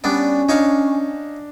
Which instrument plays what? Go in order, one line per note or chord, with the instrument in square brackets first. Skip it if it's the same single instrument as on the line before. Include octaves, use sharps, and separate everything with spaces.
[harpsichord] G3 B3 D4 [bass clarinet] C#4
[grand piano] D4 [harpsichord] D#4 C#5 F5